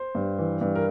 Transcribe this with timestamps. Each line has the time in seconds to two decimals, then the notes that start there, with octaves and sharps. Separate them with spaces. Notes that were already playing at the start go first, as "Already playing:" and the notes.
Already playing: C5
0.15 G2
0.39 E3
0.61 G2
0.75 A#4